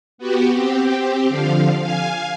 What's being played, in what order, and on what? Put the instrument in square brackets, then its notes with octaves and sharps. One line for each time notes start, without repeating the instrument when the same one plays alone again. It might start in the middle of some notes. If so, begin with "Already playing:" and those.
[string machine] B3 F#4 G4
C4 G4
D3 F3 F5
F5 G#5